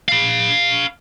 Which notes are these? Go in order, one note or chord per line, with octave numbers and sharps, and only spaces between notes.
F5 B5